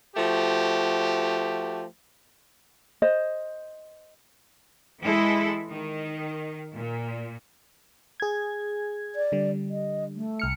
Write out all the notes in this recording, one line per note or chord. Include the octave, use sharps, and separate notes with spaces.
F3 A3 F#4 G4
C5 D#5
E3 G#3 E4 A4
D#3
A#2
G#4 G#6
D5
D3 G3
D#5
A3
C2 F6 C#7